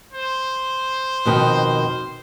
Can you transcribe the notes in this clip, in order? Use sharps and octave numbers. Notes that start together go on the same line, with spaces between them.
C5
F2 B2 D#3